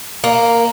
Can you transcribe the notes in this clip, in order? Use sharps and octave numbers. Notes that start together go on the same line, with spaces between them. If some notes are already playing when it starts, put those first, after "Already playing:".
A#3